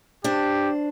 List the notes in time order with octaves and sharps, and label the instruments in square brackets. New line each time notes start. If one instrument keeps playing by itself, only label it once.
[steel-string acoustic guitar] D4 C5 [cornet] G4